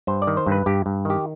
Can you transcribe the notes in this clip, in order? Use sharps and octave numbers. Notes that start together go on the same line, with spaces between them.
G2 C5
D5
D#3
C5
G2
B4
G2 G4
G2
D#3 G4